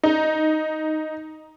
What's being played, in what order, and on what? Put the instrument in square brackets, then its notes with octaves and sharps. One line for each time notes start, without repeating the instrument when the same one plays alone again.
[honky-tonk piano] D#4